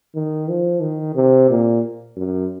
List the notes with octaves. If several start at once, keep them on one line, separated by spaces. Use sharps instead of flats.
D#3
F3
D#3
C3
A#2
F#2